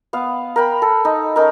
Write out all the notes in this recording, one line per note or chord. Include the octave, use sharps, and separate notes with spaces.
B3 F5
A#4 G5 B5
A4
D#4
C#4 D#4 A#4